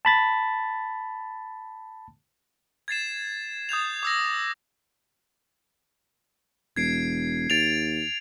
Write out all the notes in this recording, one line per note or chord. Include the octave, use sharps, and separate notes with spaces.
A5 B5 A6
G#6 A6 C7 E7
D#6 G6 G#6 F7
D6 E6 A#6
E1 G#6 C7 D7
D#2 A6 D7 F7